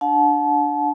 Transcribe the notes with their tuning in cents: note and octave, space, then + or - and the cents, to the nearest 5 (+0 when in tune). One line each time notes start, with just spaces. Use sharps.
D4 +5 F#5 -40 A5 -30